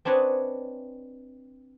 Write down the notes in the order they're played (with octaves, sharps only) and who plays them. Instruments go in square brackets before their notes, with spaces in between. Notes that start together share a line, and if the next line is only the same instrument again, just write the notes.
[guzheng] C4 D4 B4 C#5 D#5 G#5